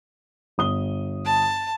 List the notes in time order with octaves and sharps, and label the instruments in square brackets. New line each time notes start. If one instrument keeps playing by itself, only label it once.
[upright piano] G1 D#6 G7
[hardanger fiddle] A5